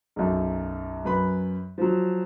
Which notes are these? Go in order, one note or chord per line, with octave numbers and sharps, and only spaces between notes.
B1 F#2
F#2 B4 B5
F3 F#3